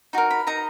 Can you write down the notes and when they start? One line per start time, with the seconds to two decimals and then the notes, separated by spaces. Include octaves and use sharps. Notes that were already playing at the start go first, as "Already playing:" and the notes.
0.13 D#4 F#4 A#4
0.31 B5
0.47 D#4 A#4 D#5 A#5